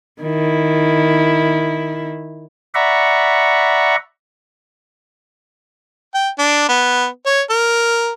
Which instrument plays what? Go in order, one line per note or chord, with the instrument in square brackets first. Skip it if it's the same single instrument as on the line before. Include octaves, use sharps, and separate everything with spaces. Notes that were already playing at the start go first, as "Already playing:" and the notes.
[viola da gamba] D#3 E4
[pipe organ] D5 E5 F#5 A#5 B5 C#6
[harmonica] G5
D4
B3
C#5
A#4